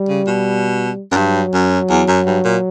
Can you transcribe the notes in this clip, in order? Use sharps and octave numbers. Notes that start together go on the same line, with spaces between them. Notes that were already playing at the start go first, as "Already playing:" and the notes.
Already playing: G3
C#3
B2
F#2
G2 F#3
F#2
E2
F#2
G2
A#2